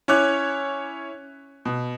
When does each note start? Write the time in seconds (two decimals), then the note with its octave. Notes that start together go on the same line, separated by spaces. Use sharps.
0.08 C#4 E4 C#5 D6 F#6
1.65 B2